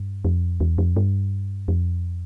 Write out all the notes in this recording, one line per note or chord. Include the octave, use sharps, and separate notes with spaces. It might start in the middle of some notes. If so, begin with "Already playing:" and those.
Already playing: G2
F2
E2
F2
G2
F2